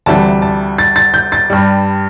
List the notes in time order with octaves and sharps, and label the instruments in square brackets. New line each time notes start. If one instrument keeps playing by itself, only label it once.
[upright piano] D2 C3 E3 G3 A5
A5
A6
A6
G6
A6
G2 G3